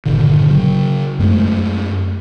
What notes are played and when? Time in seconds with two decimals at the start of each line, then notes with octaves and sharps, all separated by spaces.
0.06 G1 A#2 D3 D#3
0.48 C#3 F#3
1.19 F#2 G#3 A3